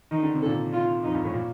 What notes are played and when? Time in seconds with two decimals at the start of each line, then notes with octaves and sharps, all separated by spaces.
0.11 D#3 D#4
0.23 D3
0.35 C3
0.42 A#2 D3 A4
0.73 F4
1.03 F2 D#4
1.15 G2
1.24 A2
1.34 A#2